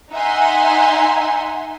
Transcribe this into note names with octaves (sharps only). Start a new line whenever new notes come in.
D#4 E5 F#5 G#5 C6